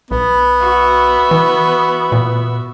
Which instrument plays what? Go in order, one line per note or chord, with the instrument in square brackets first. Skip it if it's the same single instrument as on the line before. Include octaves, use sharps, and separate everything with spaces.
[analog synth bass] B1 [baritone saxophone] B3
[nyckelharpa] F#4 E5
[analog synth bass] E3
A#2